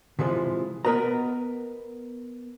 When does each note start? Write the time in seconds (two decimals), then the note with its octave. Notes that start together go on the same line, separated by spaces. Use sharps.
0.19 C3 E3 F3 G#3
0.85 B3 A#4 B4 D#5 A#5